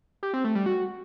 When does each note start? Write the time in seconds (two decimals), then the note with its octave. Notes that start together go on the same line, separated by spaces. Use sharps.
0.23 G4
0.34 C4
0.44 A3
0.55 G3
0.66 F#4